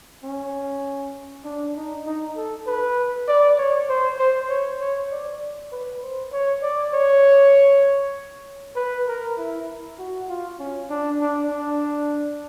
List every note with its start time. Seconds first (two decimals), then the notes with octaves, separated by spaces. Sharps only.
0.23 C#4
1.44 D4
1.76 D#4
2.06 D#4
2.36 A4
2.67 B4
3.28 D5
3.58 C#5
3.89 C5
4.19 C5
4.49 C#5
4.80 C#5
5.11 D5
5.72 B4
6.02 C5
6.32 C#5
6.62 D5
6.94 C#5
8.76 B4
9.07 A#4
9.38 E4
9.99 F#4
10.29 F4
10.59 C#4
10.90 D4
11.21 D4
11.51 D4